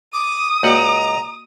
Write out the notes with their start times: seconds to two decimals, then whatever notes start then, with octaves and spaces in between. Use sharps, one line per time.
0.13 D6 D#6
0.63 C#2 A#3 F#4 D5 F#5 A#5